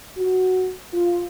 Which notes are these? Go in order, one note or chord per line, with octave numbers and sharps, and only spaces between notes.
F#4
F4